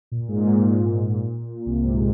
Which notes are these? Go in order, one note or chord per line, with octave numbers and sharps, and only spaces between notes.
A#2
G#2
A#2
C2 C3
G#2